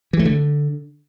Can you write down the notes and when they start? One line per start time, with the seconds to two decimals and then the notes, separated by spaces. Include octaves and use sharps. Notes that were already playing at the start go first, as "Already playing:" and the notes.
0.13 E3
0.19 A3
0.25 D3